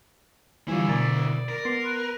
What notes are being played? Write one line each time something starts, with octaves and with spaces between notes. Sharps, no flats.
D3 E3 G3 E4 F4 G#5
B2 A#4 D5
A#4
B3 C6
B4